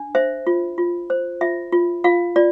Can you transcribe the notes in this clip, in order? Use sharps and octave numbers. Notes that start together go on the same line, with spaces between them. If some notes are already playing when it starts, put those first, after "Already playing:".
Already playing: D4
C5 E5
F4
F4
C5
F4 E5
F4
F4 F5
F4 D5